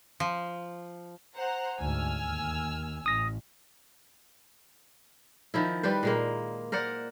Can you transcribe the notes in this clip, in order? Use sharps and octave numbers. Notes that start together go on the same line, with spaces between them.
F3
C5 F#5 A#5
D2 G#2 G#5 E6 F6
D#2
A1 D#6 A#6
D#3 F3 E4
G3 G4 B4 C5
A#2 G#3 A#3
A#4 C5 D5 F#5